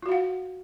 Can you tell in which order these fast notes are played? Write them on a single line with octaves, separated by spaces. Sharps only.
F4 F#4 F5 F#5